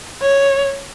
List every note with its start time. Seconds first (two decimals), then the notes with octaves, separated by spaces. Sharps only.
0.21 C#5